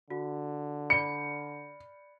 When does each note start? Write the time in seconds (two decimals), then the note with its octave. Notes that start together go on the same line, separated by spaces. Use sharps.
0.10 D3 F#4
0.90 D5 B5 C#7